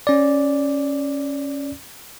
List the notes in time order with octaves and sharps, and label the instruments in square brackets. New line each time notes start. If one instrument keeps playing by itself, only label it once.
[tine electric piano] C#4 D5